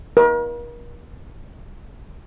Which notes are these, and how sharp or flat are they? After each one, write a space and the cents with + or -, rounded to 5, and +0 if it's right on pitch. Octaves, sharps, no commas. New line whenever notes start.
A#4 +40